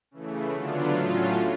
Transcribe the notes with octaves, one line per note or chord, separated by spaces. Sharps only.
C#3 E3 A3
D3 F#3 B3 D4 F4
A2 F#3 A3 C#4 F4